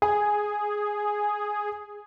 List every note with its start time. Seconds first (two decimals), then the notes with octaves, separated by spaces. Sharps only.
0.02 G#4 G#5